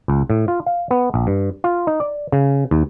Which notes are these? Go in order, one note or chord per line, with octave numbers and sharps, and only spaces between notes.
C#2
A2
F4
F5
B3
A#1
G2
F4
D#4
D5
C#3
D#2